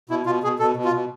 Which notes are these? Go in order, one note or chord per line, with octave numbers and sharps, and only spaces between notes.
B2 E4
B2 F4
B2 G#4
B2 A4
B2
F4
B2